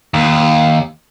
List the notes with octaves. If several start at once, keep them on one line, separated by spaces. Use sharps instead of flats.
D#2